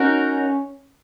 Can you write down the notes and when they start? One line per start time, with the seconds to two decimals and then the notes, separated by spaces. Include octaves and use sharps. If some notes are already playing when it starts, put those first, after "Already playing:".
Already playing: C#4 D#4 F#4 A#4